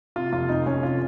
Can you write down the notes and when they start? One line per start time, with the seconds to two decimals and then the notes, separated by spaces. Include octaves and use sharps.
0.16 C3 F4
0.33 F1 F4
0.49 F2 D#4
0.66 F1 C#4
0.83 C3 F4